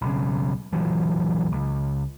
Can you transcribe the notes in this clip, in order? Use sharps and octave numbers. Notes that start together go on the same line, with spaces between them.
B1 C#3
A#1 E3 F#3
C#2